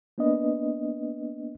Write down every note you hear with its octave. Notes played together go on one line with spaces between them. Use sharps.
A#3 B3 D4 B4 D#5